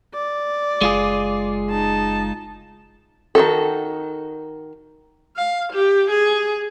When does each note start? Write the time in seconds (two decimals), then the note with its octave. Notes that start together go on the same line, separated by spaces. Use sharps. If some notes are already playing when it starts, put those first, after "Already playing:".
0.14 D5
0.81 F#1 G#3 F4 G#4
1.70 D#4 A5
3.35 D#3 E3 F#4 A4
5.37 F5
5.73 G4
6.11 G#4